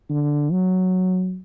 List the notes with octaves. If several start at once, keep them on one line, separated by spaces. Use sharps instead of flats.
D3
F#3